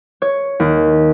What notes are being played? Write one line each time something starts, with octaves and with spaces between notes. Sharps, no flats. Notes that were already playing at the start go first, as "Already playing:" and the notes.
C#5
D#2